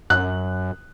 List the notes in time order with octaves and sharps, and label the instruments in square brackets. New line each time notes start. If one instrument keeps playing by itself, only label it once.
[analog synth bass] F#2 [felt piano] F#6